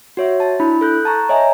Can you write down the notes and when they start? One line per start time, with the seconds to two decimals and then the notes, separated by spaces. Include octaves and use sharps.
0.17 F#4 C#5 E5
0.40 A5
0.60 D4 E4 B5
0.81 A4 F#6 G6
1.05 A5 A#5 C#6
1.29 C#5 D#5 E5 G#5 A#5